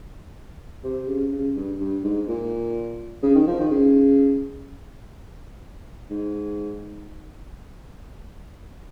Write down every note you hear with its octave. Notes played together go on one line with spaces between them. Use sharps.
C3
C#3
C#3
G2
G2
G#2
A#2
C#3
D#3
F3
D#3
C#3
G#2